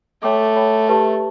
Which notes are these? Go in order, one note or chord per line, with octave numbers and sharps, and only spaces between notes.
A3 C#5 G5 B5 D6
C#5 G5 B5 D6
G4 B4 E5 A5 C#6